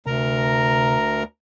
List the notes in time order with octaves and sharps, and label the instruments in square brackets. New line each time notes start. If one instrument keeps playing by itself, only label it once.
[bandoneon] D2 A#4 A#5 [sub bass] C3